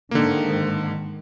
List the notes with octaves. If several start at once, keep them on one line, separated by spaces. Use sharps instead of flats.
G#2 D3 D#3 A#3